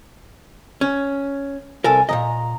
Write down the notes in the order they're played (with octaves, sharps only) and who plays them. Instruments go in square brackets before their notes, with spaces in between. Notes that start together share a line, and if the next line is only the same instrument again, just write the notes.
[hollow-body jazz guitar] C#4
[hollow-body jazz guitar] C2 A4 A#4 [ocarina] G#5
[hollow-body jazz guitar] A#2 C#3 D#5 [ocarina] A#5